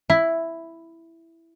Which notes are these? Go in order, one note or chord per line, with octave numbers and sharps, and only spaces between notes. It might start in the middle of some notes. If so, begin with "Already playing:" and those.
E4